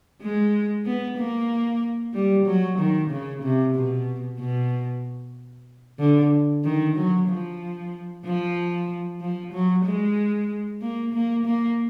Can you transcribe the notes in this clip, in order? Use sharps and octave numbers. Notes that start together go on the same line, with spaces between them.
G#3
B3
A#3
G3
F#3
D#3
C#3
C3
B2
B2
D3
D#3
F#3
F3
F3
F3
F#3
G#3
A#3
A#3
A#3